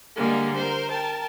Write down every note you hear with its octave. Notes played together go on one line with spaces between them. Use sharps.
D3 G3 G#3 A#3
A#4 C5
A#4 G5 A5